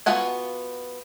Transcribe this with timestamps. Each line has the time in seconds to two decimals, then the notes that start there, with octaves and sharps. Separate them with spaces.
0.06 B3 F4 F#4 F#5 G#5